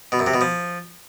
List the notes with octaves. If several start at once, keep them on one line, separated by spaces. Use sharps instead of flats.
B2
F#2
C3
B2
F3